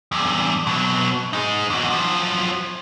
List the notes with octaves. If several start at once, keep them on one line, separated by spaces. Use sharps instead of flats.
E2 G2
B2 F#3
G#3 D#4
E2 F#4
F3 F#3